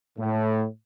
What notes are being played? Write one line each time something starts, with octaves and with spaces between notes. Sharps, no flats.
A2